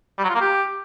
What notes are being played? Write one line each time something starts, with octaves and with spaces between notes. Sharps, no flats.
G3
F#3
F4
A#3
G4